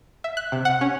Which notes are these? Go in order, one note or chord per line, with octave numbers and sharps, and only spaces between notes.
E5
F#6
C3
F#5
C#4